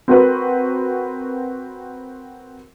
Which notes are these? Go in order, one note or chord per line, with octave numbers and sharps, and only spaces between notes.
C4 F#4 A#4 B4